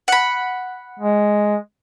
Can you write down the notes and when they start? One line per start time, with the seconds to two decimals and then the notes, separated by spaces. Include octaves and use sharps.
0.08 F#5 B5
0.99 G#3